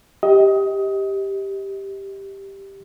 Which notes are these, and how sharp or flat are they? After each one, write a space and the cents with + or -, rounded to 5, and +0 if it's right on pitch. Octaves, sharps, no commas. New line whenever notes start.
G4 +0 D#5 +25